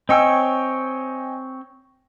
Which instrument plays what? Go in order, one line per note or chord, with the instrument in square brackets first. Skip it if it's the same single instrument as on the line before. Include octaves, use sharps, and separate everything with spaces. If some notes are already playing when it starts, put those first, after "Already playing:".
[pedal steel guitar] C4 C#5 E6 [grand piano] D#5 G5 G#5